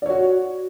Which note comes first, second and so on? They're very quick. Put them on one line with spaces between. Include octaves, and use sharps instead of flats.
D5 C#5 F#4